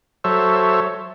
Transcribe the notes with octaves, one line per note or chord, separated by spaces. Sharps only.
F#3 A4 C5 C#5 E5